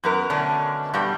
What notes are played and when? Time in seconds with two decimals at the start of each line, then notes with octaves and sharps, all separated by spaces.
0.04 F#2 B3 A#4
0.30 B2 D3 A3 C#4 D4
0.94 G2 B2 G3